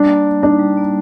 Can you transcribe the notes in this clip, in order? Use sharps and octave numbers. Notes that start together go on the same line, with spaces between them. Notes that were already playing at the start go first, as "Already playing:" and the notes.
Already playing: G3 D4
A#3
G3
D4 D#4
G3
A#3